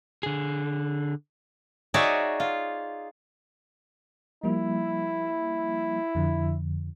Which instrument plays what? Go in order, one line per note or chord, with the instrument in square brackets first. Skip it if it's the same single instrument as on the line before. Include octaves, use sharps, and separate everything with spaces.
[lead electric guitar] D3 G#4
[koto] D#4 F#4 G#4 C#5 D5 E5
F4
[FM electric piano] F3 G3 A#3 [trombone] E4
[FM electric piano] F2 D3 F3